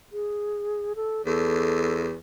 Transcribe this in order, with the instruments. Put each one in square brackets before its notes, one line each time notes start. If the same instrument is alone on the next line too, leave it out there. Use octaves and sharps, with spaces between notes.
[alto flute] G#4
A4
[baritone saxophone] E2 [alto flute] A4